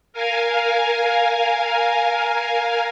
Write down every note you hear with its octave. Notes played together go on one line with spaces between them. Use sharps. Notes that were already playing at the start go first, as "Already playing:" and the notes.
A#4 F5 G#5